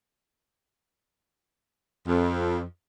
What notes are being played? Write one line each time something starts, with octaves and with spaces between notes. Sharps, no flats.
F2